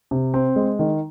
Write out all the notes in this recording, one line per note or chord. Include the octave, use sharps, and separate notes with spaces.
C3
C4
G#3
D#3